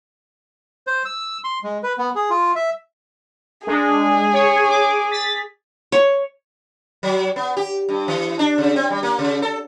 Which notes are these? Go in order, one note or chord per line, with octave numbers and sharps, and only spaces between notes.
C5
E6
C6
G#3
B4
B3
G#4
F4
E5
G#3 D4 G#4
C#5
D6
A6 B6
C#5
F#3
B3
G4
G2
E3
D4
C#3
C4
G3
A#3
C#3
A4